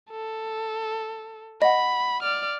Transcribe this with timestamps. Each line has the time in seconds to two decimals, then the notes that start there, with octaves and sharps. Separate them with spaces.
0.11 A4
1.62 D#5 F#5 B5
2.23 D5 F6